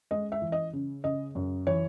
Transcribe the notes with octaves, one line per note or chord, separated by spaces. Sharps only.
G#3 D#5
E5
E3
D#5
C#3
C#3 D#5
F#2
E3 C#5